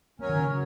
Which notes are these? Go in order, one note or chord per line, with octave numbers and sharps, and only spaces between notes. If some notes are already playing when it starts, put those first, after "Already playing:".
F#3 A#3 C#4 A#4 C#5
D#3
C#3
F#3